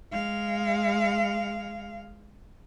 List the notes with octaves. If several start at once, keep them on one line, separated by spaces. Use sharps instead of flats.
G#3 F5